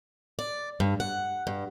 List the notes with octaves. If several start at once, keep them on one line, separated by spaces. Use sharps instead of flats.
D5
G2
F#5
G2